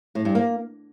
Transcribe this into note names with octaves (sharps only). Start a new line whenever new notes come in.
A2
G2
A#3